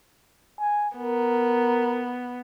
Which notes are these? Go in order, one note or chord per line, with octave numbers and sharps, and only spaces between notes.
G#5
B3 A#4